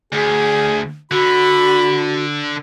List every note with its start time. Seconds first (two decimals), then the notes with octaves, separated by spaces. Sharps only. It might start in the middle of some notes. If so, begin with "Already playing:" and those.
0.13 D2 G#4
1.11 D3 F#4 B5